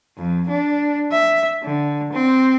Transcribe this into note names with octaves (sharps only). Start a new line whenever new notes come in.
F2
D4
E5
D3
C4